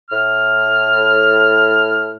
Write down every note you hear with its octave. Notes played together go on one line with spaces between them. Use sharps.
A2 F6